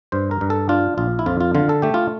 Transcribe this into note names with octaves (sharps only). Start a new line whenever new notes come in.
G2 C5
A#4
G2
A4
D4 F4
A#1 F4
E4
F2 F4
F4
D3 F4
A4
A3 G4
F4